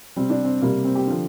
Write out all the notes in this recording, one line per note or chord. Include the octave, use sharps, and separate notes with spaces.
C3 G3 C4
D4
C4
C3 G3 A#3
C4
G4
D3 F3